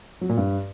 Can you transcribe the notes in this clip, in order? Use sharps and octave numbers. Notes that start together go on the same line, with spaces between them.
F#3
A#2
G2